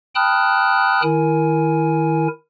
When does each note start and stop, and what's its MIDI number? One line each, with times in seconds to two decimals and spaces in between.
0.15 1.02 79
0.15 1.02 81
0.15 1.02 83
0.15 1.02 87
0.15 1.02 89
0.15 1.02 90
1.03 2.28 51
1.03 2.28 64
1.03 2.28 70
1.03 2.28 80